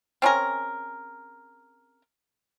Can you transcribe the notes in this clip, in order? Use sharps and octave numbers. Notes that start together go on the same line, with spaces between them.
C4 C#4 G#4 A#4